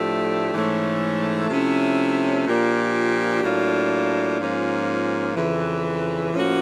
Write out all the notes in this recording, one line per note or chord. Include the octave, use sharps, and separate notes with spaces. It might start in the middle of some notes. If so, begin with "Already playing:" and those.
Already playing: A2 F3 A3 D4 G4
G#2 E3 A3 C#4
C3 F3 A3 C#4 E4
A#2 F3 A#3 D4 G4
A2 F#3 A#3 D4 F4
G#2 F3 A#3 C#4 F4
F2 C#3 E3
A2 F3 A#3 C#4 F#4